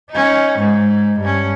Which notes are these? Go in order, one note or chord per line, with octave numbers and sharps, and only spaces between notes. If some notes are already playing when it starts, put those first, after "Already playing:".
C#4 D#4
G#2
G2 C#4